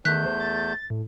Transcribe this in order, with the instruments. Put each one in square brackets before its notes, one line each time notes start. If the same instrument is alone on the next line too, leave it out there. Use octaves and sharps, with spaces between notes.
[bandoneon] E2 A3 G6 [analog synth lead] D#3 [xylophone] F#6 B6
[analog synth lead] C5
A6
A2